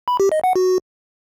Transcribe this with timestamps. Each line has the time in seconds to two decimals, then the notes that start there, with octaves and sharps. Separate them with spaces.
0.08 B5
0.20 G4
0.32 D#5
0.44 F#5
0.56 F#4